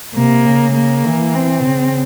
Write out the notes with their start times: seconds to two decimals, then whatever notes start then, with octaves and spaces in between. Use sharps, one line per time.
0.15 C3 A#3
0.45 C#3
0.75 A#3
1.05 E3
1.35 C4
1.64 C#3